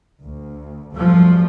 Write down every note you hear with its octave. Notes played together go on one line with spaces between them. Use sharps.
D2
F#2 F3 G3 A3